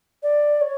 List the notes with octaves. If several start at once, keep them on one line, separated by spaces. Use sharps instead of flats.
D5
C#5